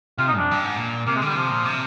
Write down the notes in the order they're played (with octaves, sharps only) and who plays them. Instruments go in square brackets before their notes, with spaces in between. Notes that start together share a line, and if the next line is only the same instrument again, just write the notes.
[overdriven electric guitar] C3 [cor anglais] F4
[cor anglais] D#4
[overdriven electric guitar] F2 [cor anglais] D4
[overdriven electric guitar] G2
G#2
A#2
[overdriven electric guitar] C3 [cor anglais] A#3
[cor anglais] G#3
[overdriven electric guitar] D3 [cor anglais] G3
[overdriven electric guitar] C3 [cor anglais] F3
[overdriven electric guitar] A#2
C3